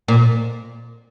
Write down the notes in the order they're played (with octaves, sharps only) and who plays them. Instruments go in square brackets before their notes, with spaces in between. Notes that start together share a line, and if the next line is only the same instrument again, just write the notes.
[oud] A#2